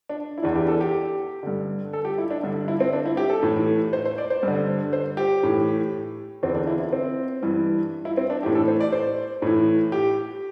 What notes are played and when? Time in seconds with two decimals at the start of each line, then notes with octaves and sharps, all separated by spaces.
0.09 D4
0.38 E4
0.42 E2 E3 D4
0.56 G4
0.68 A4
0.81 G4
1.43 G2 D3
1.93 A4
2.05 G4
2.18 E4
2.31 D4
2.43 G2 D3 D4
2.68 E4
2.80 C4
2.93 D4
3.06 E4
3.17 G4
3.30 A4
3.43 A2 E3
3.93 C5
4.05 C5
4.18 D5
4.30 C5
4.43 G2 D3
4.93 C5
5.17 G4
5.43 A2 E3
6.43 E2 C4
6.46 D3
6.55 D4
6.67 E4
6.80 E4
6.93 C4
7.43 G2 E3
8.05 E4
8.17 C4
8.30 D4
8.43 A2 E3 G4
8.55 A4
8.68 C5
8.80 D5
8.92 C5
9.42 A2 E3
9.92 G4